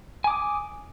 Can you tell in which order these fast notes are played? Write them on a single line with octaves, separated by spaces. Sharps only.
G#5 D6 D#6